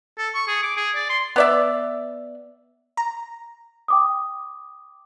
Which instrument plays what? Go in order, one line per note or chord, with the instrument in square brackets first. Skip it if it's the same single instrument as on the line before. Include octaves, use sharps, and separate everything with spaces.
[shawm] A4
C#6
G#4
D6
G#4
D5
C6
[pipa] B3 D5 E5
[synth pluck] A#5
[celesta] G5 D6 D#6